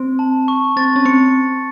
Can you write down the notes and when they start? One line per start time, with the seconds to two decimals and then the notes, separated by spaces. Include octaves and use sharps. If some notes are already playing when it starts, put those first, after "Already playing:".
Already playing: C4
0.19 A5
0.48 C#6
0.76 C4 A6
0.96 C#4
1.05 C4 C#7